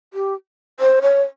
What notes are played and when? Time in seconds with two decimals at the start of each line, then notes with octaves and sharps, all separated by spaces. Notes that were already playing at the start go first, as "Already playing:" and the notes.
0.14 G4
0.80 C5
1.02 C#5